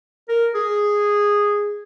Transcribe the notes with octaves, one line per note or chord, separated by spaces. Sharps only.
A#4
G#4